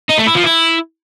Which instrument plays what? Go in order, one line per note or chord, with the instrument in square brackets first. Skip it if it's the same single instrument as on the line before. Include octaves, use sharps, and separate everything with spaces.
[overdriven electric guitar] D#4
A3
E4
F3
E4